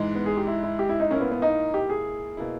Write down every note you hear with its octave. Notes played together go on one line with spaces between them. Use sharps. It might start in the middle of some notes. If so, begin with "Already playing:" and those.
Already playing: G#2 E3 G#3
B3
G#4
G4
E4
E4
G4
E4
D#4
A#2 A#3 C#4 E4 A#4
B3
B3
D#4
G4
G#4
B2 A#3 E4